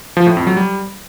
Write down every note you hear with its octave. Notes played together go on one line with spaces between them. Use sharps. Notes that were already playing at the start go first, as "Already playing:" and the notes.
F3
A2
F2
F#3
G3